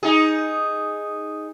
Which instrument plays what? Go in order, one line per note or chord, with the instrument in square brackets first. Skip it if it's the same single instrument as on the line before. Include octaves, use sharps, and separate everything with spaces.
[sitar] D#4 G#4